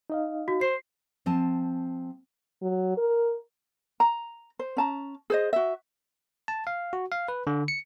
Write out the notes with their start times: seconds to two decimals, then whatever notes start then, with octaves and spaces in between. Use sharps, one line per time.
0.10 D#4 D#5 F5
0.48 F#4
0.61 C5 C7
1.26 F3 C4 G#5 A5
2.62 F#3
2.97 A#4
4.00 A#5
4.59 C5
4.77 C#4 A5 A#5
5.30 G#4 C5 D#5
5.53 F#4 E5
6.48 A5
6.67 F5
6.93 F#4
7.12 F5
7.28 B4
7.47 D3
7.68 C#7